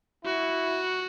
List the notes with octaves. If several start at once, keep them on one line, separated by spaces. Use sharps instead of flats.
E4 F#4